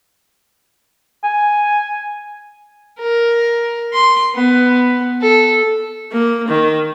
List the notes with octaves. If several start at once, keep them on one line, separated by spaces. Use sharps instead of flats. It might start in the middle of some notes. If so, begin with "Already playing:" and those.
G#5
A#4
C6
B3
A4
A#3
D#3